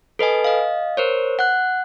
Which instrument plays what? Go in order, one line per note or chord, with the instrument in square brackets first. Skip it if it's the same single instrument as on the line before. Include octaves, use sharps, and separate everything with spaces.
[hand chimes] A4 B4 D#5 G#5
D#5 F5
A#4 C5 C#5
F#5 F#6